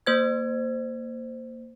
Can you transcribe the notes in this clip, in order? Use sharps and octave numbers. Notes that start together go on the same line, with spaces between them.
A#3 C5 G#6